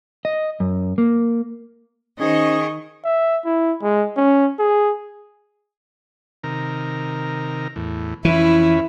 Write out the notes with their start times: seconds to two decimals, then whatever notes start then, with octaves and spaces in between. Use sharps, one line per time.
0.25 D#5
0.60 F#2
0.98 A#3
2.20 D#3 C#4 D#4 G#4 C5 D#5 C#6
3.05 E5
3.45 E4
3.82 G#3
4.17 C#4
4.59 G#4
6.44 C3 D#3 A#4
7.76 E2 A2
8.25 F2 E3 C#4 E4 B4